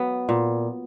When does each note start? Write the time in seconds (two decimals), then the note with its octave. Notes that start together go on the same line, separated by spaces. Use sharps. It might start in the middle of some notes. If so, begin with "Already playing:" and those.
Already playing: F#3 B3
0.29 A#2